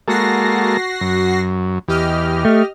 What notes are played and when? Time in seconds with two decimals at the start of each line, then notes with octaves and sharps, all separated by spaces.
0.08 G#3 A#3 F#4 A4 A#6 C7
1.01 F#2
1.88 E2 G4 D#5 F6
2.45 A3